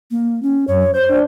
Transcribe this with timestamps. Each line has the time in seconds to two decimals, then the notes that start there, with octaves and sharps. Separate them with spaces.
0.11 A#3
0.43 C#4
0.68 F#2 C#5
0.94 C5 G6
1.09 D4